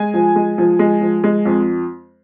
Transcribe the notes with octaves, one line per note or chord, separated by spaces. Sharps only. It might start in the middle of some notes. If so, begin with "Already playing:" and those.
Already playing: G#3 G#5
F3
G#3
F3
G#3
F3
G#3
F2